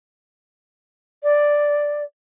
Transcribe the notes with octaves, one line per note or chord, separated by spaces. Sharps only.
D5